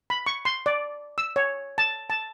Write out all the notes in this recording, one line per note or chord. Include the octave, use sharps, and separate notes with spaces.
B5
C#6
C6
D5
E6
C#5
A5
A5